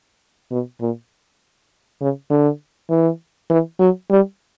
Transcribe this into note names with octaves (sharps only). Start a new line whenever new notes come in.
B2
A#2
C#3
D3
E3
E3
F#3
G3